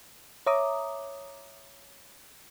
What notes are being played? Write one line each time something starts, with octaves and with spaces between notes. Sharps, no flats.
C#5 E5 A#5 D6 D#6